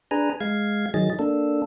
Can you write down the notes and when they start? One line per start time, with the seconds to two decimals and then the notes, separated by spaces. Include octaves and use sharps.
0.11 D4 G#4 B4 G#5 A#5
0.40 G#3 F5 G#6
0.94 D#3 F#3 G#4 D#5 A6
1.19 A#3 D4 A4